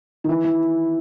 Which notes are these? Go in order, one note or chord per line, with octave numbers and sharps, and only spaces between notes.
D#3
E3
E3